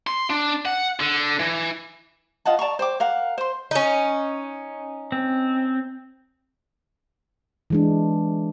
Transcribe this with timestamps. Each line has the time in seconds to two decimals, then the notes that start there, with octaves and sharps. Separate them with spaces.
0.07 C6
0.30 D4
0.65 F#5
1.00 D3
1.39 E3
2.46 F4 D#5 F#5 A5
2.59 D5 A5 A#5 C#6
2.79 C5 G5 D6
3.00 A#4 F5 F#5
3.38 C5 C6
3.71 C#4 D#4
5.12 C4
7.70 E3 G#3 D4